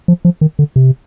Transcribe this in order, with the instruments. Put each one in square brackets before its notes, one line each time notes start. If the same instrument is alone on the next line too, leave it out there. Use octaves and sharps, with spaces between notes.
[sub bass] F3
F3
D#3
D3
C3